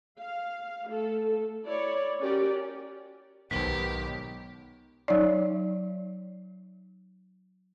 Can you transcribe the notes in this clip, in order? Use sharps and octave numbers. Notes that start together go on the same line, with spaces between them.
F5
A3 A4
E4 C#5 D5
C#4 F#4 G4 A#4 D5
B1 G#2 D#3 B3 G4 C5 B6
F#3 D#4 C#5 D5